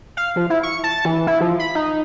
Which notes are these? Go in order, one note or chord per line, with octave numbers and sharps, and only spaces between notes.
F5
F3
E4
C#6
A5
E3
E4
F3
B5
D#4